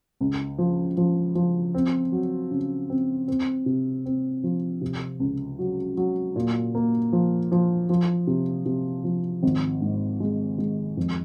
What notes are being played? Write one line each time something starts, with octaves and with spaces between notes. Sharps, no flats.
C#2
F3
F3
F3
C4
F#3
C#3
C4
C4
C3
C4
F3
C3
C#2
F#3
F#3
A#2
A#3
F3
F3
F3
C3
C3
F3
G#1
G#2
G#3
G#3
F2